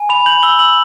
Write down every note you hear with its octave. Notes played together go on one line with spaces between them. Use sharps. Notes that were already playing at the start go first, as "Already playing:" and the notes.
Already playing: G#5
B5 F7
G6 F#7
E6 G7
E6 F#7